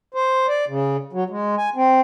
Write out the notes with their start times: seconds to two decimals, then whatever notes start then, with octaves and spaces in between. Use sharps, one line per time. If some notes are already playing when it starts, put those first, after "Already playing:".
0.14 C5
0.48 D5
0.68 C#3
1.13 F#3
1.30 G#3
1.58 G#5
1.76 C4